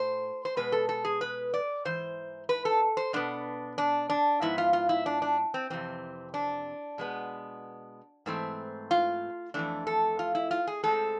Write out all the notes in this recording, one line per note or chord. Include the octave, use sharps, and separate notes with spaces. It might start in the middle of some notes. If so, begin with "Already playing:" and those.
Already playing: A2 C5
C5
B2 G#3 B3 B4
A4
A4
G#4
B4
D5
G#2 E3 C5
B4
A4
C5
B2 B3 D4
D4
D4
G#2 F3 B3 E4
F4
F4
E4
D4
D4
C4
F2 C3 E3 C4
D4
B2 G#3 B3
G#2 E3 A3 C4
F4
F2 E3 A3 D4
A4
F4
E4
F4
G#4
A2 G#3 C4 A4